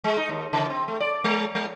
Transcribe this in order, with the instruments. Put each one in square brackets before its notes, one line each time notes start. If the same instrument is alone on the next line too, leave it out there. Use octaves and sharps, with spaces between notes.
[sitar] G#3
D#4
D#2
C#3
C4
A3
D5
G#3
G#3